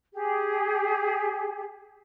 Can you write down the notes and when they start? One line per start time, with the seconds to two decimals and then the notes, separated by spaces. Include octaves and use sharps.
0.14 G4 G#4